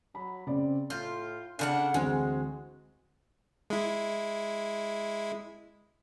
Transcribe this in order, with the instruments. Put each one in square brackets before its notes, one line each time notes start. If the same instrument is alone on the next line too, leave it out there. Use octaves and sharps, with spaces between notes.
[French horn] F#3 [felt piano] B5
[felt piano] C#3 D5 [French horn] C4
[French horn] A2 [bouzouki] F4 [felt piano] G6
[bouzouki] C#3 A#4 F#5 [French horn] D4
[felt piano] D2 E3 C4 [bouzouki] G#3 [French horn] F#4
[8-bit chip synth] G#3 E4